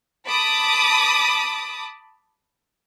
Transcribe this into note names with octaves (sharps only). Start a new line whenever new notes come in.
A5 B5 D6 D#6